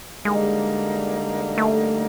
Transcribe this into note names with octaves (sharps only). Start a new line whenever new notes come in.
D3 G3 G#3 A#3 D#4
A3